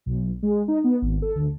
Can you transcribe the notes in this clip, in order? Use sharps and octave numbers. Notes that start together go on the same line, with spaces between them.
B1
G#3
D#4
B3
G#1
A4
D2